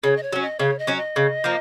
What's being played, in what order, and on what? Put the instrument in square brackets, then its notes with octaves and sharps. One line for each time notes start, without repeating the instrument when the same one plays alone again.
[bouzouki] C#3 [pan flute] C#5
[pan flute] D#5
C#5
[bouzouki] F#3 C#4
[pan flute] D#5
[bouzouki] C#3 [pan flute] C#5
[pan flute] D#5
[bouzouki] F#3 C#4
[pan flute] D#5
[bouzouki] C#3
F3 A#3